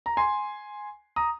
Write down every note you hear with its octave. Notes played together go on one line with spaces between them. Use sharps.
A#5
G#5 C6
A#5 D#6